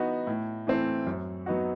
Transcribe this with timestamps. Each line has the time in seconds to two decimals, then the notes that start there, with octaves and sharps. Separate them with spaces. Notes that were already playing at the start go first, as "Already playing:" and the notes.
Already playing: E3 B3 D#4 F#4
0.27 A2
0.67 E3 A3 C4
1.07 F#2
1.46 F#3 B3 D#4 F#4